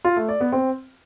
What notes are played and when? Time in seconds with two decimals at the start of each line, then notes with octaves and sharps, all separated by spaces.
0.04 F4
0.16 A3
0.28 D5
0.40 B3
0.52 C4